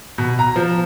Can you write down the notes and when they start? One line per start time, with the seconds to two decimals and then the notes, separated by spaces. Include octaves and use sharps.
0.18 B2
0.39 A#5
0.56 F3